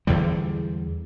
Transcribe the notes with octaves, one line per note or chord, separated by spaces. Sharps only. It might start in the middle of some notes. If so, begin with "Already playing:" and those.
E2 D3 G3